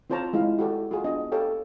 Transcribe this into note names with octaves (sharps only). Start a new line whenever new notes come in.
C4 F4 C5 C#5 A5 A#5
G#3 E4 F4 F5
F#4 G4 A4 D5
F4 F#4 G#4
B3 D4 D#5
G4 A4 C#5 F5 G5